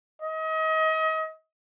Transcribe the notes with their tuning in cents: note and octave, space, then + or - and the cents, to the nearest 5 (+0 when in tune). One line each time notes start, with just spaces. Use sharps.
D#5 +35